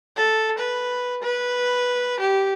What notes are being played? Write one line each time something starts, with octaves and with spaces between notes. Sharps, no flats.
A4
B4
B4
G4